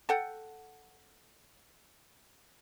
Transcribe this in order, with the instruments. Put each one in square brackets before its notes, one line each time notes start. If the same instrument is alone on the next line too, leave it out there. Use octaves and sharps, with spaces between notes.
[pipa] A4 F#5 G5